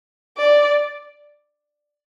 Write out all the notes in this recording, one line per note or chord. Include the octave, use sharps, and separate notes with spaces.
D5